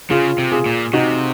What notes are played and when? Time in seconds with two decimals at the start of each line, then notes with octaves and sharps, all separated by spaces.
0.10 C#3 F4 G#4
0.38 C3
0.52 F4 G#4
0.66 A#2
0.93 C3 D#4 F#4